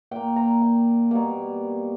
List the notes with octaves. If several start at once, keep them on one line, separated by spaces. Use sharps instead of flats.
A#2 A#3 G5
A#5
G5
B2 G3 A#3